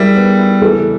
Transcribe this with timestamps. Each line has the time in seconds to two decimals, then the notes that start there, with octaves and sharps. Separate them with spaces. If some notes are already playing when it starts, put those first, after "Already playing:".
Already playing: G3 E4 G#4 A#4
0.16 B3
0.39 E4
0.62 E3 A4 B4